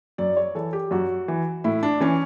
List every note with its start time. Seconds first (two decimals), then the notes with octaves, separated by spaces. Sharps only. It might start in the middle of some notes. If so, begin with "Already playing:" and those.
0.18 F#2 D5
0.37 C#5
0.55 E3 A4
0.73 G4
0.91 F#2 F#4
1.28 E3
1.64 A2 E4
1.83 D4
2.00 E3 C#4